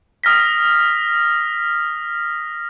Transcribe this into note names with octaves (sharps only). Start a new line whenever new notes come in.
D#6 F6 A#6 B6